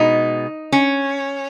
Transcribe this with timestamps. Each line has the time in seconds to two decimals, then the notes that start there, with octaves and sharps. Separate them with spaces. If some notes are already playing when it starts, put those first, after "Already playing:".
Already playing: B2 G#3 B3 D#4
0.72 C#4